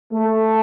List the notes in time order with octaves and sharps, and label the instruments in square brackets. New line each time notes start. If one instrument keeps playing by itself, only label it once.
[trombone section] A3